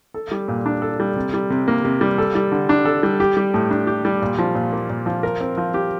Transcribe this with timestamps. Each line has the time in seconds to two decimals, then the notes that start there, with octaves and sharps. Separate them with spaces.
0.14 A4
0.31 G3
0.48 A#2
0.66 D4
0.82 A4
1.00 G3
1.16 C3
1.34 G3
1.50 C3
1.68 A#3
1.84 C3
2.01 G3
2.18 A4
2.35 G3
2.52 D3
2.69 D4
2.85 A4
3.03 G3
3.20 G4
3.37 G3
3.54 A2
3.71 D4
3.87 G4
4.05 G3
4.22 A#2
4.39 F3
4.55 A#2
4.72 A#3
4.90 A#2
5.06 F3
5.23 A#4
5.40 C4
5.57 F3
5.74 G4